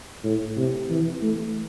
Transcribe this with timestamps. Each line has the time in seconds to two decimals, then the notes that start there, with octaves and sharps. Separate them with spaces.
0.24 A2
0.57 C3
0.89 E3
1.22 A3